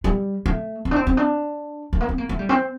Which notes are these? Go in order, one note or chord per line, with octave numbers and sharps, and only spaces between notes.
G3
A3
C4
D4
C4
C4
D4
A3
A#3
C4
A#3
A3
G3
C4